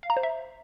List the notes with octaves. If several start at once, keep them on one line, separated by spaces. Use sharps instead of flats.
F5
A#5
C5
E5